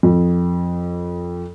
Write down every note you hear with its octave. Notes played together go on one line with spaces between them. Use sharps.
F2